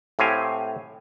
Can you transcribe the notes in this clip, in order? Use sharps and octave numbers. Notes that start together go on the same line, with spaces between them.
A2 C4 G4 F5 G#5